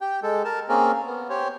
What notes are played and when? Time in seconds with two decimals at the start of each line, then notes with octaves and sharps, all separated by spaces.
0.01 G4 G5
0.23 G#3 A4
0.44 A#4 A5
0.69 A#3 C4 C#4 G#4 A#4
1.06 B3
1.29 G4 C5 C#5